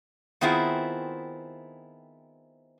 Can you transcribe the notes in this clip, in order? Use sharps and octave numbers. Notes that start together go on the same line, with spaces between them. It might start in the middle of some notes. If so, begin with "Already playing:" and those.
D#3 B3 C4 E4 F4 G#4